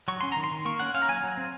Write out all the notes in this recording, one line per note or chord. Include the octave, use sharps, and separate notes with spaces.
F#3 C#6
C#4 C6
D#3 A#5
C6
D#3
A#3 C#6
C#4 F#5
C#4 F5
A#5
F#3 G#5
F#3
C4